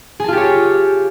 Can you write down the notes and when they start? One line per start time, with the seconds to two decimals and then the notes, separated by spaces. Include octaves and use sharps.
0.20 G#4
0.24 A5
0.28 F4
0.33 G4
0.37 C#5